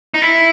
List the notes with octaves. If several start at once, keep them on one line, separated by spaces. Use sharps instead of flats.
D#4
E4